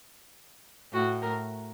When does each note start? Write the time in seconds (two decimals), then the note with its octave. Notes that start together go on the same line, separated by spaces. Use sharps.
0.92 A2 F#4
1.22 A#4